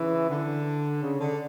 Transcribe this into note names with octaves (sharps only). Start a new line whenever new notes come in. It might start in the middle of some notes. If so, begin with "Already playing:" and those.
Already playing: C#3 E3
D3
C#3
D3